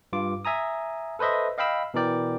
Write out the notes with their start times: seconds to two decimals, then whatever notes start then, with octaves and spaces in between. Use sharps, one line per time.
0.13 G2 F4 D6
0.45 E5 G#5 A#5 D#6
1.19 A4 B4 C5 D#5 E5
1.58 D#5 F5 G5 B5 E6
1.94 B2 E3 A#4 D5 G5